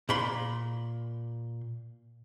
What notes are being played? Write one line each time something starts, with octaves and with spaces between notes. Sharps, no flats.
A#2 B5 C6